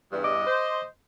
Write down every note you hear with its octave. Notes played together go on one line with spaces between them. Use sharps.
E2 G2
D#5 D6
C5